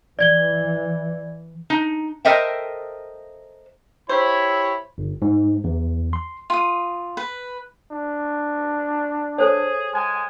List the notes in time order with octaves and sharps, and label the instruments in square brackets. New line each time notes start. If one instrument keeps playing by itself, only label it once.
[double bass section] E3 [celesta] D5 G#6 G7
[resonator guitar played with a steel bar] D#4
A4 A#4 C5 D#5 E5 G5
[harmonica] E4 [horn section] G4 C#5 [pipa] C5 [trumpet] B5
[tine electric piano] G1
G#2
E2
C6
[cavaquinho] F4 D#6
B4
[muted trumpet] D4
[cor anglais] G#4 [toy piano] A4 C5 C#5
[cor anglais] G#3 [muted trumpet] G#5